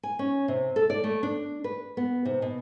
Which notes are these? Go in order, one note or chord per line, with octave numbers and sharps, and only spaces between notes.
G#5
C#4
C3
A4
D5
A3
D4
B4
B3
C3
B2